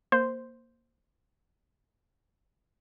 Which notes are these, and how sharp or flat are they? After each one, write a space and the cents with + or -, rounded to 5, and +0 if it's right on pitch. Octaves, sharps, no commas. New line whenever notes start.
A#3 +0 C5 +0 C6 -10